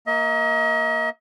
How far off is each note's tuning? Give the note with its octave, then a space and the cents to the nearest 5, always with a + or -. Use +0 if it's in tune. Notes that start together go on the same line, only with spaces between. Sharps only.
A#3 +0 D#5 +40